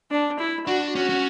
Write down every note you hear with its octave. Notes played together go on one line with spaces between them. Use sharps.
D4
E4
D4 F#4
C#4 F#4
C#4